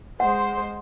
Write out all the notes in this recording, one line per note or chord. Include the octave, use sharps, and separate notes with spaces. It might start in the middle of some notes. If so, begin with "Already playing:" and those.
G#3 C5 F#5